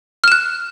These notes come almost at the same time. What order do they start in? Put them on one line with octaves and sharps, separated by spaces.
F6 E7 F#6